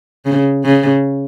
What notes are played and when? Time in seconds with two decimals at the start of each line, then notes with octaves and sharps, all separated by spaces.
0.25 C#3
0.64 C#3